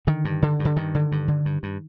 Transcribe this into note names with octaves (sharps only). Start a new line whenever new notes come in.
D3 D#3
G2
D3
G2
D3
G2 D#3
D3
G2
D3
G2
G2